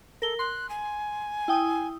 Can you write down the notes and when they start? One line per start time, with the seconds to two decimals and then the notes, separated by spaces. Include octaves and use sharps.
0.22 A4 A#4 G7
0.39 C6 F#6
0.69 G#5
1.48 E4 G5 D#6